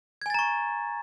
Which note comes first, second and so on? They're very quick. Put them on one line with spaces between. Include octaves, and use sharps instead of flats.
G#6 G#5 A6 A#5 C#6